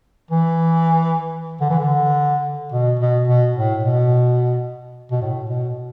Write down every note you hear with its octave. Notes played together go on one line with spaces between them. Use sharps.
E3
D3
E3
D3
B2
B2
B2
A2
B2
B2
A2
B2